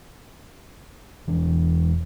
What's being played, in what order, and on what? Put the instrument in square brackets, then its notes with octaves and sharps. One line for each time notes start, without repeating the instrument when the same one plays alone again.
[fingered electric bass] E1 E3